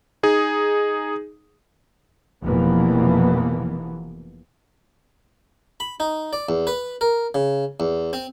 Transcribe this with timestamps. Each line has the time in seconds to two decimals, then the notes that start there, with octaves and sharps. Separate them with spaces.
0.23 D#4 G#4
2.44 F1 B2 E3 F3 A#3 B3
5.80 B5
6.00 D#4
6.33 D5
6.49 E2
6.67 B4
7.01 A#4
7.34 C#3
7.80 E2
8.13 C4